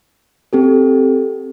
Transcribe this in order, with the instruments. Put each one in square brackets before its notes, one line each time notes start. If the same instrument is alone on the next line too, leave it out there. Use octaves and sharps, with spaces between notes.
[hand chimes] C4 G4 A4